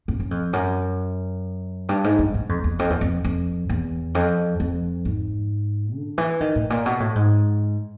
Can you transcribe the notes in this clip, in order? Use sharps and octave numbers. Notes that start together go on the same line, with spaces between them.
F2
F#2
F2
F#2
G2
G#2
G2
G2
F2
E2
F2
E2
F2
F2
E2
F2
F2
G#2
D3
E3
D#3
A2
A#2
B2
A2
G#2